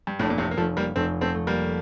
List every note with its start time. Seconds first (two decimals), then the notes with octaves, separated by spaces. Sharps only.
0.07 G2
0.19 F1 F2 A2
0.30 A#2
0.38 A2 C3
0.51 A#3
0.57 F1 F3 A3
0.77 G3 A#3
0.96 F1 A3 C4
1.21 A3 C4
1.34 A3
1.47 G3 A#3